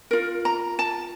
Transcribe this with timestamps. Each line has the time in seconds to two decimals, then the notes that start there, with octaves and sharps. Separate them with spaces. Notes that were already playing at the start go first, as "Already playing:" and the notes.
0.11 F4 A#4
0.45 A#5
0.79 A5